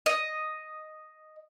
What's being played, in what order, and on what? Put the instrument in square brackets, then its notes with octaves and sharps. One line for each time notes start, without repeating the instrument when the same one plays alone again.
[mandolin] D#5